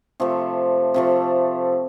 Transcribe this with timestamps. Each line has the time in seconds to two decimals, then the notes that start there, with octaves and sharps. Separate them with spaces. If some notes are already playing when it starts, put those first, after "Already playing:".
0.20 C3 F3 A3
0.94 C3 F3 A3